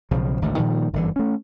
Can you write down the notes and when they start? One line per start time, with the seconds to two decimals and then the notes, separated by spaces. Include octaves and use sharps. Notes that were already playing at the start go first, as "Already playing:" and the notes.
0.11 B1 C#3 F3
0.42 G#1 D2 A2
0.56 A#2 D#3 F3 G3
0.93 G1 F#2 D3 E3
1.16 A3 C#4